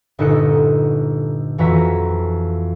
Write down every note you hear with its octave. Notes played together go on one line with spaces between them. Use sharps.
G1 A#2 D#4 A4 F#6 C#7
F2 E3 F4 F#4 E5 A#5